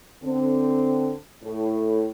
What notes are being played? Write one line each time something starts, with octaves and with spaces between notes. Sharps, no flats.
D3 C4
A2